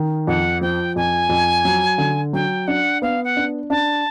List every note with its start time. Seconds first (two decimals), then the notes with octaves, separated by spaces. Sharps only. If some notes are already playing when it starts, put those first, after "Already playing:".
Already playing: D#3
0.27 F2 F#5
0.61 F3 G5
0.96 F2 G#5
1.29 F2
1.65 F#3
1.98 D3
2.33 F#3 G5
2.67 D4 F#5
3.02 B3 F5
3.24 F#5
3.37 D4
3.70 D4 A5